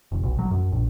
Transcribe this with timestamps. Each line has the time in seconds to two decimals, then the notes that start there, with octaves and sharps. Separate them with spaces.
0.12 F1
0.23 B1
0.39 F#3
0.51 F#2
0.72 A#1